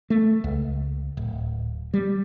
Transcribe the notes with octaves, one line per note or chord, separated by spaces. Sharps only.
A3
C#2
D1
G3